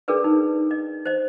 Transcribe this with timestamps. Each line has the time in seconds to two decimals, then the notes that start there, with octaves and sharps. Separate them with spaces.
0.08 D4 G#4 A#4 B4 D5
0.24 D#4
0.71 D#5
1.06 C5 D#5